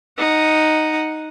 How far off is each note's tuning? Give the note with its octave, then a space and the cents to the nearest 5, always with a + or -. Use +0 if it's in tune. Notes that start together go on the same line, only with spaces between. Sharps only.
D#4 +0 F#5 -5